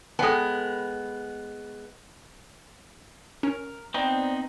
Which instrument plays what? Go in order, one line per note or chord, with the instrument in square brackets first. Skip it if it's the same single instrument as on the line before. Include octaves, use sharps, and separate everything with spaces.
[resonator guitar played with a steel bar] G#3 B3 [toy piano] A4 G5 A5
[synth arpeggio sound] C#4 [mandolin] A#4
[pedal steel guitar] B3 C4 D#4 [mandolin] C5 D5 G5